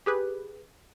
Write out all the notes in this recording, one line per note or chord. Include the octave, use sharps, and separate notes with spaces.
G4 G#4 B4